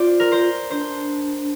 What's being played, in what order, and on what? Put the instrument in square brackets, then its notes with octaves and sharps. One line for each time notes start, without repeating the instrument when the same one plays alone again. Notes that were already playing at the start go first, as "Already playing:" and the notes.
Already playing: [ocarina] F4 [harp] C5 D5
[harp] A#4
C5
[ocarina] D4 [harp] C5